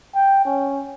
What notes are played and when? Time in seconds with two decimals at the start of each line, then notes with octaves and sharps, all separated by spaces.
0.15 G5
0.45 C#4